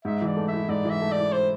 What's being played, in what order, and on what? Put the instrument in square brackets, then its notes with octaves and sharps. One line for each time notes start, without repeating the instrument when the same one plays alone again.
[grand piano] G#2 [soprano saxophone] E5
[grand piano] E3 [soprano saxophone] D5
[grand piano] A3
[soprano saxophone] E5
[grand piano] E4
[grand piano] G#2 [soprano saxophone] D5
[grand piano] E3 [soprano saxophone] E5
[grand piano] A3
[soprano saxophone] D5
[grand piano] E4
[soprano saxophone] C5